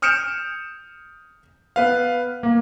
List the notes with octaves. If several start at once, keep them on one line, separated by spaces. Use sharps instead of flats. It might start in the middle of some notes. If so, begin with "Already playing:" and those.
D#6 F6 G6 C#7 D7 E7
B3 B4 F5
A#3